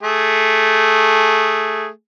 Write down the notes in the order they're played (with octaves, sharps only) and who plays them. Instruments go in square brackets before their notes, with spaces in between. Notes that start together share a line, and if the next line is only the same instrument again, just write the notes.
[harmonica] A3 G#4